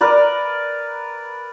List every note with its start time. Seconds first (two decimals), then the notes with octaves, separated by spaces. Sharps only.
0.01 A#4 B4 D5